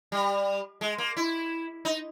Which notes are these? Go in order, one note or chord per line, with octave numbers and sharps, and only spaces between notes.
G3
G#3
A#3
E4
D#4